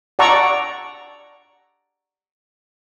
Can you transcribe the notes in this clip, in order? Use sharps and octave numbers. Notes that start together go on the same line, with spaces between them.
D5 F#5 A5 A#5 C#6 E6